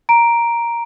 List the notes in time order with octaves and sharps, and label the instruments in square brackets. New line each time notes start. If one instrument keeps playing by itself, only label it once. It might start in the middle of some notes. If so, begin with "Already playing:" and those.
[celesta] A#5 D7